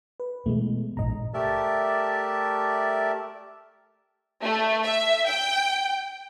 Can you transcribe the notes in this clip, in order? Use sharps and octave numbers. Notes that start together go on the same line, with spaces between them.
B4
B2 E3 G#3 A3
A#1 G#2 C3 D#5 A#5
A3 G4 A#4 D5 E5 A5
A3
E5
G5